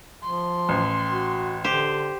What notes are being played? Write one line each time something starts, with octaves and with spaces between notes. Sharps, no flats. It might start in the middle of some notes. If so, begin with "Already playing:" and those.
F3 C6
A1
F#4
D3 G4 C5